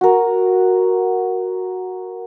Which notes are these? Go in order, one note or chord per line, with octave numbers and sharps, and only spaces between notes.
F#4 A#4